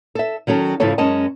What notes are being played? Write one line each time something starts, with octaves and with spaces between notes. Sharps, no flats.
A4 E5
D#3 F#3 C#4 A4
G#2 C#3 E3 F4 A4 C#5
F#2 G#3 C#4 A#4 D#5 A5